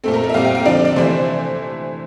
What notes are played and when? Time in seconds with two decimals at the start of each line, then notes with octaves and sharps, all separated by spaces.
0.04 A#2 A3 C4 A4
0.14 A#4
0.24 A4
0.29 E5
0.34 A#2 G3 C4 F5
0.45 G5
0.55 F5
0.65 D3 F3 C4 D5
0.85 D5
0.96 C3 E3 A3 C5